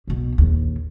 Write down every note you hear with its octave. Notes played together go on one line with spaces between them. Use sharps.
B1 B2
A#1 D#2